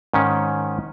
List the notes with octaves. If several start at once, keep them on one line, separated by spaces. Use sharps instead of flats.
G#2 D#3 C#4